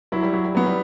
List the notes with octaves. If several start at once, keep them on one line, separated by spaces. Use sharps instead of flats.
F#3 E4
G3
F#3
G3
F#3 B3
G3